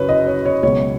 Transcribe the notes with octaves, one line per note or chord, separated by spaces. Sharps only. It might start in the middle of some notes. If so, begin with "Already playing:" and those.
Already playing: F#2 C#3 B4 C#5
D#5
C#5
C#5
C#2 B2 F#3 C#5